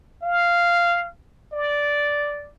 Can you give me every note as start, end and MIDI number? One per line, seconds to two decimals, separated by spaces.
0.22 1.08 77
1.53 2.49 74